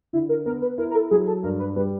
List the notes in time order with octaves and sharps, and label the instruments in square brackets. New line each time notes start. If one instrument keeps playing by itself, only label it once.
[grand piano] D3 [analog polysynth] E4
[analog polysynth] A#4
[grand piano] B3 [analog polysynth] A#4
[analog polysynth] B4
[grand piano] E4 [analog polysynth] A#4
[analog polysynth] A#4
A4
[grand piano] F#3 [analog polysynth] G#4
[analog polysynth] A4
[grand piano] G2 [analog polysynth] A#4
[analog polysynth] B4
[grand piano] G3 [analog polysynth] B4